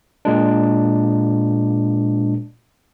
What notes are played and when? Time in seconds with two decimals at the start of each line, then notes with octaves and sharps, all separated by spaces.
0.25 A#2 G#3 D4